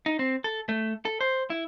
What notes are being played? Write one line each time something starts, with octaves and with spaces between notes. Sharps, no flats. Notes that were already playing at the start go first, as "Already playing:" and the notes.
D#4
C4
A4
A3
A4
C5
E4